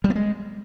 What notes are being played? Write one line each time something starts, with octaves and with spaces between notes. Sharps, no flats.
G3
B3
G#3